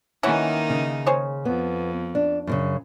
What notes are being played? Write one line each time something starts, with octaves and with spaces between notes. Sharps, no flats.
D#3 E3 A#3 C#4 D#4 F#5
C#3
G#4 C5 C#5
F2 B3
D4
F#2 A#2 C#3